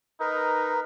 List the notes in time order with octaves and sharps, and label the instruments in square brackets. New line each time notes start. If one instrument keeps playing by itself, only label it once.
[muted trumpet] D#4 [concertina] A#4 B4